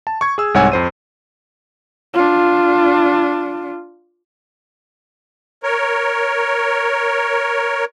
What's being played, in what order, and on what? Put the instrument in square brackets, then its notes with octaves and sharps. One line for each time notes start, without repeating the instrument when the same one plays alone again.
[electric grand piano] A5
C#6 G#6
G#4 E6
C2 G#2 C#5 F#5 G#5 E6
F2 C5 D#7
[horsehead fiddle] D4 F4
[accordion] A#4 C#5